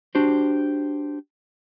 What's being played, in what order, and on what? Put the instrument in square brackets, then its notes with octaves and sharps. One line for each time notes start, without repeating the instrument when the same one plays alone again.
[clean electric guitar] D4 F#4 G4 C5